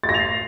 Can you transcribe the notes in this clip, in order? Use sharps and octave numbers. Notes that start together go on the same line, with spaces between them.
A6
A#6
F7
C7